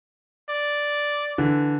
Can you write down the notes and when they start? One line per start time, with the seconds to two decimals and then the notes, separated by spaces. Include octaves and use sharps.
0.49 D5
1.38 D3 E3